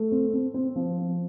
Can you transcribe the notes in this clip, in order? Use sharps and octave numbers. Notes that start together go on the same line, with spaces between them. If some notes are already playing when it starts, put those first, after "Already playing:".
Already playing: A3
C4
C4
C4
F3
C4